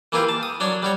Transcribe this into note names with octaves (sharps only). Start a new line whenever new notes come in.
E3 A#3 E4 F4 G4
A5
D#6
F#3 D4 C#5
G3 F#4 C#5